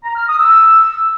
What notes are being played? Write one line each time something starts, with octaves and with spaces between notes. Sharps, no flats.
A#5
F6
D#6
E6